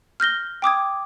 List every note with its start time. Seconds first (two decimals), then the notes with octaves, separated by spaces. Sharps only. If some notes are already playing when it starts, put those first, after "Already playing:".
0.20 F6 G6 A#6 G7
0.62 G5 D6 D#6 G#6